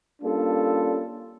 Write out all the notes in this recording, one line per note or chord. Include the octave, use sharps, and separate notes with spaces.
G3 A#3 C#4 D4 F4 A4